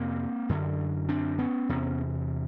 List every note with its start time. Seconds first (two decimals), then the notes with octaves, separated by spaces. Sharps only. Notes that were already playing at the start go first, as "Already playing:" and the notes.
Already playing: F2 C3 A#3 C4
0.49 F#2 D3
1.09 C4 D4
1.39 B3 C#4
1.69 E2 C3